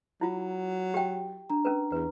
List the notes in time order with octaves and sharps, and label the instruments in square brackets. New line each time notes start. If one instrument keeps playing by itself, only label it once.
[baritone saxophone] F#3 [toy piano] E4 F4
[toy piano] G4 G5
[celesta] D4 A#5
[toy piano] C#4 A#4 B4
[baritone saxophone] E2 [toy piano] B4